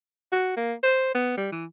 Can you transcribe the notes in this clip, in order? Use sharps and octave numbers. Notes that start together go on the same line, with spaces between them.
F#4
A#3
C5
B3
G3
E3